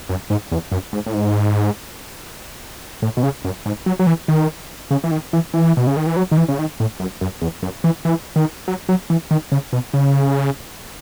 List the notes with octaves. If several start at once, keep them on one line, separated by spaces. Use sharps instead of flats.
F#2
G#2
E2
F#2
G#2
A2
G#2
A2
B2
C#3
F#2
G#2
F#3
F#3
E3
D#3
C#3
E3
D#3
E3
E3
B2
C#3
D#3
E3
F#3
D#3
E3
C#3
D#3
A2
F#2
F#2
E2
F#2
E3
E3
D#3
F#3
F#3
E3
D#3
C#3
B2
C#3